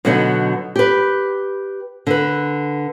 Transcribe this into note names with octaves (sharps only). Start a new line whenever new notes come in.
B2 D3 F#3 B3 D#4
G4 B4
D3 B4